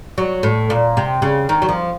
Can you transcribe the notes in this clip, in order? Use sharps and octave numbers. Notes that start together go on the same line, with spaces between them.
F#3
A2
A#2
C3
C#3
D#3
F#3
F3